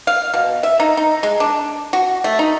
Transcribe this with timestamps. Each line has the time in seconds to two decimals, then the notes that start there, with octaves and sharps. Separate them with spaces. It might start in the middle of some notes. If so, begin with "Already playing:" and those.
0.07 F5
0.34 B2
0.63 E5
0.80 D#4
0.97 D#4
1.23 G#3
1.40 D4
1.93 F#4
2.24 A3
2.39 D#4